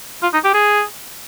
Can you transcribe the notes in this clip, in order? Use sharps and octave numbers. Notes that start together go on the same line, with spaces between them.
F4
D#4
G4
G#4